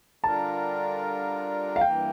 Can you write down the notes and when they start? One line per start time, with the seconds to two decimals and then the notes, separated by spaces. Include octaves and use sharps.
0.24 D3 G3 D4 F4 A#4 A5
1.76 F5
1.81 G2 E3 A#3 G5